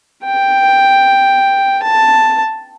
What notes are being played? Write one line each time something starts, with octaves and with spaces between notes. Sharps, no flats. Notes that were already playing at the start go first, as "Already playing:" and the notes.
G5
A5